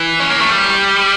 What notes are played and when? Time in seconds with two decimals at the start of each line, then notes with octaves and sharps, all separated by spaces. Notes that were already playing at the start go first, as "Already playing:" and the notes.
Already playing: E3
0.20 C#4
0.30 A#3
0.41 A3
0.50 G3